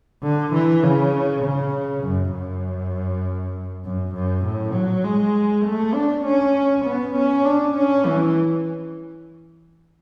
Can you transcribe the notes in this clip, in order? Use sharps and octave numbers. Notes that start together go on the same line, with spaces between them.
D3
E3
C#3
C#3
F#2
F#2
F#2
F#2
A2
F#3
G#3
A3
D4
C#4
B3
C#4
D4
C#4
E3